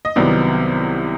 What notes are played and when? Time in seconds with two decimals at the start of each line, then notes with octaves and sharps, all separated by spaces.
0.05 D#5
0.16 C2 C3 D#3 F#3 B3 D5